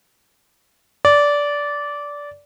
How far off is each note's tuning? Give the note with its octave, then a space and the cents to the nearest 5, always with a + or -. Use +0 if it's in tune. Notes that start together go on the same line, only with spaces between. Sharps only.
D5 -15